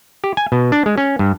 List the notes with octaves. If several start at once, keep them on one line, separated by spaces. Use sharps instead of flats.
G4
G#5
B2
D4
G#3
C#4
G2